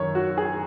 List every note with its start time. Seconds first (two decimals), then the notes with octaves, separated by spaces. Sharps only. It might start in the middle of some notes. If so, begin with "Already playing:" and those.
Already playing: F#2 D#3 C#5
0.15 F#4
0.37 G#4